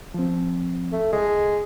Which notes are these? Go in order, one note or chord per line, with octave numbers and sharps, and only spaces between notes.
F3 C4
A3
C2 G#3